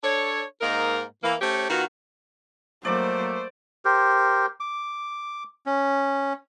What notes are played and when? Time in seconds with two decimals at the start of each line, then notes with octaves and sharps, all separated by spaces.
0.04 D4 A4 C#5
0.61 G#2 A#3 D#4 A#4
1.24 E3 A#3
1.41 A3 C#4 G4 C5 C#5
1.69 D#3 B3 F4 F#4
2.85 F#3 A3 A#3 C5 D5 D6
3.85 G4 A#4 C5
4.60 D6
5.66 C#4